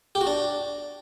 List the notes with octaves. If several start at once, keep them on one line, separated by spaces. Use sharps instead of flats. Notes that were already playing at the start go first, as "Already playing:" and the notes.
G4
F#4
D4